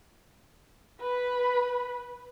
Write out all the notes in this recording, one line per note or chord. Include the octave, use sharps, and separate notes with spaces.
B4 B5